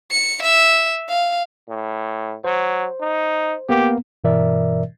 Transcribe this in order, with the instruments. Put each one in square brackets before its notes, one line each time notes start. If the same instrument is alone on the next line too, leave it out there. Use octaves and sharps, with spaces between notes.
[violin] C#7
E5
F5
[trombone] A2
[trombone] F#3 [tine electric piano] C5
[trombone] D#4
[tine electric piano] A#3 B3 [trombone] G4
[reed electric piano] G2 B2 E3 A#4 D5 E5